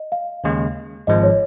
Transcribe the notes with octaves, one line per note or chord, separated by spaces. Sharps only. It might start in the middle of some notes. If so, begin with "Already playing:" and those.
Already playing: D#5
F5
D#2 C#3 G#3
G#1 G#2 F3 G#3 D#5
C#5